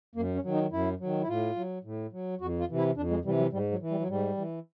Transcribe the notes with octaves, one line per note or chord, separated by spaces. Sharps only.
F#2 A#3
C#4
D#3 F#3
D#4
F#2 E4
D#3 F#3
E4
A2 F4
F#3
A2
F#3
F2 F#4
F4
C3 E3
E4
F2 D4
G#3
C3 E3 G3
F#3
G#2 G3
F#3
E3
G3
F#3
G#2 G3
E3